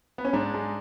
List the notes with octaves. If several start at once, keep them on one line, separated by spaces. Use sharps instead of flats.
B3
C#4
G#2 D4
G#3